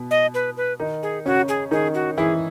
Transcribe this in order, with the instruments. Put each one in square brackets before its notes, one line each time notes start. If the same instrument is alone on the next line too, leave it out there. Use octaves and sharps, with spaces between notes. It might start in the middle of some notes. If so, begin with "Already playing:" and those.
Already playing: [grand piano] B2 B3
[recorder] D#5
B4
B4
[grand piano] D#3 D#4
[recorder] G#4
[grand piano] C#3 C#4 [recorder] F#4
[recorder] G#4
[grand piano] D#3 D#4 [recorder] G#4
[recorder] F#4
[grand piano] E3 E4 [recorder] G#4